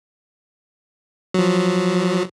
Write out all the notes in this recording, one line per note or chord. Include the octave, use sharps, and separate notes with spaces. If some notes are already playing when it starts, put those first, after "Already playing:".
F3 F#3